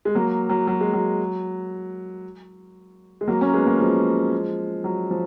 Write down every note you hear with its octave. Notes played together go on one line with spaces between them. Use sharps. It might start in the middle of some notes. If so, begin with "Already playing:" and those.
G#3
F#3 A#3
F#3
F#3
G#3
F#3
G#3
F#3 A#3
A#3 C#4
G#3 B3
F#3 A#3
F3 G#3
F#3
F3